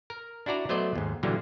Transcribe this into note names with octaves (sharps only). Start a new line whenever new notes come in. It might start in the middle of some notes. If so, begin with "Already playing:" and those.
A#4
D4 E4 F#4 D5 A#5
F#3 A3 B3 C5 D5 D#5
D#2 G#2
A#2 D3 E3 F#3 G3 A#3